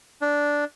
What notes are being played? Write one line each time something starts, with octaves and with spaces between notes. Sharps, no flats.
D4